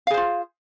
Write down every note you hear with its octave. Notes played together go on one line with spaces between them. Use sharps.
F4 G#4 C5 F5